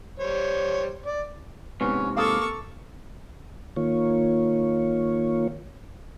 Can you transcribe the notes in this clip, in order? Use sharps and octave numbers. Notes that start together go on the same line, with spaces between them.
G3 C5 C#5
D5
G#2 C3 B3 C#4
A#3 A4 F5 C#6 D#6
D#3 A#3 F4 C#5